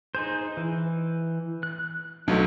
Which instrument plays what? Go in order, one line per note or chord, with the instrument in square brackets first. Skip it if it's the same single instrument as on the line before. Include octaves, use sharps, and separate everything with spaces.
[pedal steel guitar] D#4 G#4 C5 [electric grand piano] G6
[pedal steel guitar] E3
F#6
[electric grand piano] B1 F#3 A3 [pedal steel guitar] D4 D#4 B4